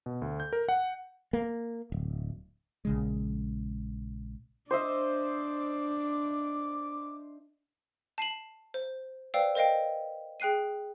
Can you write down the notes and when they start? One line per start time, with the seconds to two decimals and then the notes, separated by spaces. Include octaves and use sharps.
0.06 B2
0.22 D2
0.40 G6
0.53 A#4
0.69 F#5
1.33 A#3
1.92 D1
2.85 A#1 C#3 G#3
4.71 D4 C5 D#5 E5 D6
8.18 A5 C7 D#7 F#7
8.74 C5
9.34 B4 C5 D5 F5 G5 E6
9.55 A#4 C5 D#5 F5 G5
10.40 G#4 G5 F#6 C7 D#7